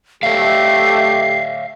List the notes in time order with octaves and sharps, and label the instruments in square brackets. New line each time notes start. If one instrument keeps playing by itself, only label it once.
[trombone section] A3 [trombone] G4 [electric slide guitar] C#5 E5 F5 [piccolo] C7